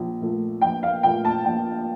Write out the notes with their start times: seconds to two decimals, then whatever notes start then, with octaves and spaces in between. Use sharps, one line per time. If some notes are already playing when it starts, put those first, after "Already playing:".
Already playing: A#1
0.21 A#2 F3 A3
0.61 A#1 G5
0.83 F5
1.03 A#2 F3 A3 G5
1.25 A5
1.45 A#1 G5